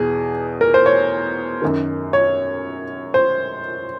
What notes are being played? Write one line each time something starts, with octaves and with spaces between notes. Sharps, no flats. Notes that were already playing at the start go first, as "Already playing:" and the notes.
Already playing: E2 B2 G#4
A#4
C5
C#5
F#2 D#3
C#5
C5